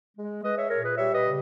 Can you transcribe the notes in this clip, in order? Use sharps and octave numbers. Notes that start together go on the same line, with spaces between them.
G#3
G#3 B4 D#5
C#5 E5
A#2 A#4 C#5
G#4 B4
G3 C#5 E5
B4 D#5
C#3